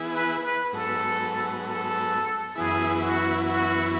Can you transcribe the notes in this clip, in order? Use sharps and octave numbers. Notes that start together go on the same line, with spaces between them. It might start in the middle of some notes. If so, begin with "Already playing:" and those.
Already playing: E3 B3 E4 G#4
B4
B4
G#2 F#3 B3 A4
A4
F#2 E3 B3 E4 G#4
F#4
F#4